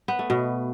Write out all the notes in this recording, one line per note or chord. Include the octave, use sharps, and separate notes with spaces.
B3
A3
B2